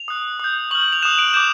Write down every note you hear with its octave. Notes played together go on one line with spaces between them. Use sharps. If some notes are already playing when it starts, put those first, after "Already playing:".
Already playing: F7
D#6 F#6
D#6 G6
C#6 F6 F#7
F#7
F7
D#6 F#6 E7
D7
D6 G6 E7